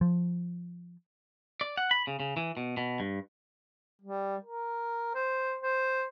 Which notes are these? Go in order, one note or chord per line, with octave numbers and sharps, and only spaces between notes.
F3
D5
F#5
B5
C#3
C#3
E3
B2
B2
G2
G3
A#4
C5
C5